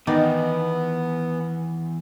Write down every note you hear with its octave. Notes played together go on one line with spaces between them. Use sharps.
E2 D#3 B3 D#4 D5